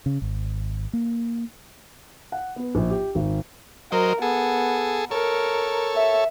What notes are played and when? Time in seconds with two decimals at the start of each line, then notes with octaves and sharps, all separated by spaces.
0.06 C#3
0.22 G#1
0.93 A#3
2.32 F#5
2.56 B3
2.75 A#1
2.90 G4
3.15 G#1
3.92 F#3 A#4 C5 D#5
4.22 B3 G#4 A4
5.11 A4 A#4 C#5
5.96 E5